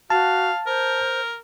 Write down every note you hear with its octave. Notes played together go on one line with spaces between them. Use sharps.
F#4 F5 A5
A#4 C5